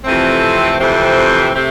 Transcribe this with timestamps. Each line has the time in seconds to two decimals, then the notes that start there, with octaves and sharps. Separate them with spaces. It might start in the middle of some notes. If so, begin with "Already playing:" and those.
0.05 F2 C3 E3 A3 C4
0.80 F2 C3 E3 A3 C4
1.55 C3 A3 C4